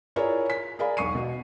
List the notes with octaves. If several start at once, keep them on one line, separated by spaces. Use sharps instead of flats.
E4 F4 G#4 A#4 C#5 D5
B6
G#4 A#4 D5 F5 B5
E1 B1 C#6 C7 D#7
B2